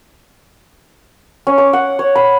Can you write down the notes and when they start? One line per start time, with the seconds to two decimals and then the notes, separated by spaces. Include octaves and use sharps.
1.47 C#4
1.58 D6
1.73 F#5
1.99 C#5
2.16 B5